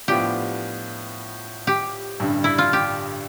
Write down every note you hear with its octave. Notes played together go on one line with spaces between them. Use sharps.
A2 F3 B3 D4 F4 G4
G4
A1 G2 D3 G3
E4
F4
G4